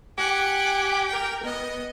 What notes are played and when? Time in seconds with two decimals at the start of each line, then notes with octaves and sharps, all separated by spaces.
0.18 G4 F#5 G#5
1.08 A#4 G5
1.43 B3 D#5